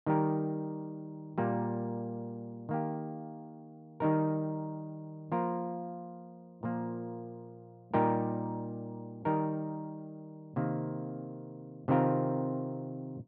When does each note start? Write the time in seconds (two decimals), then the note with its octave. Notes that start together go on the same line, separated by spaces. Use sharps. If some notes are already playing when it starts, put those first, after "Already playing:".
0.06 D#3 G3 D#4 G4 A#4
1.38 A#2 G3 A#3
2.69 D#3 A#3 G4
4.00 D#3 G3 D#4 A#4
5.32 F3 A#3 F4 A#4
6.63 A#2 F3 A#3
7.94 A#2 G3 D#4 G4 A#4
9.25 D#3 G3 D#4 A#4
10.56 C3 D#3 A#3
11.88 C3 D#3 C4 F4 A#4